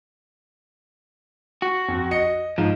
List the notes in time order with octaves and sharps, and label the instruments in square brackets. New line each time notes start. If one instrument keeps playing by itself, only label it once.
[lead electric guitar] F#4
[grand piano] F2
D#5 C#7
[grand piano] G#2 [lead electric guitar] F3